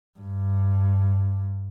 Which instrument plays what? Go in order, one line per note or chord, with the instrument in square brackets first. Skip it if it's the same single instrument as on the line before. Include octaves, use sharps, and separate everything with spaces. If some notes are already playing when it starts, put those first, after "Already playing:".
[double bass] G2